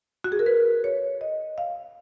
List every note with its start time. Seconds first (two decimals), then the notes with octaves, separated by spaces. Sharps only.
0.24 F#4
0.32 G#4
0.39 A#4
0.46 B4
0.84 C#5
1.21 D#5
1.58 F5